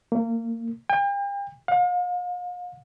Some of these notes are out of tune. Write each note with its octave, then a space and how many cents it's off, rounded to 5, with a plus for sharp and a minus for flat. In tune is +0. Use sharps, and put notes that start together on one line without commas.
A#3 -25
G5 +40
F5 +40